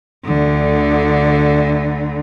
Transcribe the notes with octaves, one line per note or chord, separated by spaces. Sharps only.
D2 D3